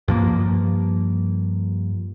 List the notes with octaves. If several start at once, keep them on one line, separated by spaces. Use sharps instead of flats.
G2 F3 A#3